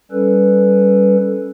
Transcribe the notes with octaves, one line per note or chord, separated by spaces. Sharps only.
G3 C#4 A4 B4